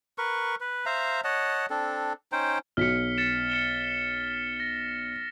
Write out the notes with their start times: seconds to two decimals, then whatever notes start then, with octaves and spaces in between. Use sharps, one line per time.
0.18 A#4 B4 C#6
0.60 B4
0.86 C5 E5 F5 A#5
1.24 C#5 D#5 F#5 A5
1.70 C4 D4 A4
2.32 C#4 D#4 C5 G5
2.77 B1 F6 B6 C#7
3.18 A6 C#7 E7
3.50 C#7 E7 G7
4.60 A#6